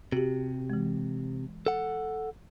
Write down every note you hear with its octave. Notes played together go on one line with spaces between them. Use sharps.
C3 F#4 G4
E3 G#3
A4 F#5